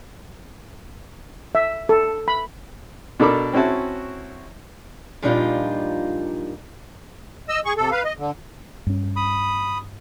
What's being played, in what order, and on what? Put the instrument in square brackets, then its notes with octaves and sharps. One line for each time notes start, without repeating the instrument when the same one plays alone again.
[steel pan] E5
A4
B5
[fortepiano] B2 D4 A4 A#4 B5 D6
C4 C#4 E4 F#4 A5
[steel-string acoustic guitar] A#2 F3 G3 D4 D#4 F4
[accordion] D#5 E6
G#4 C#6
C3 A4
B4 F5
D#5
D3
[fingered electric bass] G2 C#4
[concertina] B5 D#6